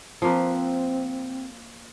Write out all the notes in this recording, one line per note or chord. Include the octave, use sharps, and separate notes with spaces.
F3 A#3 C4 B4